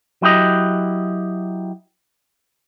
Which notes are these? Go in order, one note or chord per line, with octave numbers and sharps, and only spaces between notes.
F#3 E4 G4 D#5